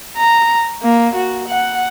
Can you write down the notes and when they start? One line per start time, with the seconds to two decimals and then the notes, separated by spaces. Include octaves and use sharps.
0.17 A#5
0.82 A#3
1.15 F#4
1.48 F#5